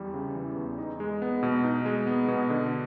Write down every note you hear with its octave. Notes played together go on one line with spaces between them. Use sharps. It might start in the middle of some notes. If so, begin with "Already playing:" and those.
Already playing: E2 E3 G3
C#3
E3
E2
D#4
G#3
B3
B2
D#4
G#3
B3
B2
D3